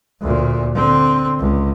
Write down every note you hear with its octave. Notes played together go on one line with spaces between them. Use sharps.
D2 A#2
D3 C4
C#2